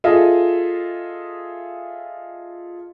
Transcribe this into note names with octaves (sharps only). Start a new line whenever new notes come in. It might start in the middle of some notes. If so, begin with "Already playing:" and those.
F4 G#4 A4 D#5 E5